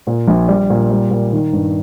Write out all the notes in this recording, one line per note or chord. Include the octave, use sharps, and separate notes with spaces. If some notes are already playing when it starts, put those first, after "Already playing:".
A#2
A#1
G3
A#2
G3
A#2
D#3
G2